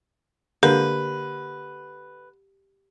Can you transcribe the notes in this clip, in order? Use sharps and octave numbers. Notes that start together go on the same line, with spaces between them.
D3 A#3 G4 B4